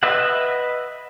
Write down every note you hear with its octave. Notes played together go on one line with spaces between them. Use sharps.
B4 D#5 E5 F#5